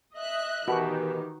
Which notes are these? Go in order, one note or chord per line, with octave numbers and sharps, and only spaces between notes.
D#5 E5 F#6
B2 D#3 E3 F#4 G4 B4